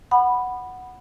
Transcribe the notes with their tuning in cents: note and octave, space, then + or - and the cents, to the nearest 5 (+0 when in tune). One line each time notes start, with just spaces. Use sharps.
F#5 +0 B5 +0 D#6 -35